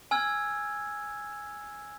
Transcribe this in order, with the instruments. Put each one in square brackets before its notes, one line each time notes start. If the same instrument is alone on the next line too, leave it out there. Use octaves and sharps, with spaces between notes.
[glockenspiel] G#5 E6 F6 G#6